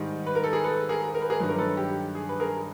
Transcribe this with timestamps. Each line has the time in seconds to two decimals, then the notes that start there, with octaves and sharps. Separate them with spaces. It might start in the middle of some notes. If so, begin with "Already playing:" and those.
Already playing: G#2 D#3 G3
0.26 B4
0.35 A#4
0.44 A4
0.53 G#4 A#4
0.64 A4 B4
0.89 G#4 A#4
1.14 A#4
1.22 B4
1.30 G#4 A#4
1.40 G2 D#3 F#3 B4
1.49 A#4
1.58 A4 B4
1.77 G4
2.15 G#4
2.29 B4
2.40 G#4 A#4